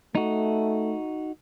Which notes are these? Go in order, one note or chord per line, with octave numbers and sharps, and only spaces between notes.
A3 D#4 F#4